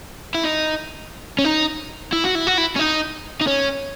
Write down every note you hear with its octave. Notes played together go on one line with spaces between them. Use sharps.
E4
D#4
C#4
D#4
E4
F#4
E4
F#4
E4
C#4
D#4
D#4
C#4